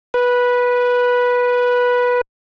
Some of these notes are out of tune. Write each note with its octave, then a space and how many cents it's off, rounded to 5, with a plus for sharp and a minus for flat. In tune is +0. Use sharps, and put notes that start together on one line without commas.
B4 -10